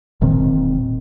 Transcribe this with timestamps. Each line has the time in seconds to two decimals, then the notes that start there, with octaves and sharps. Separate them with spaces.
0.21 E1 A#2 D#3 C4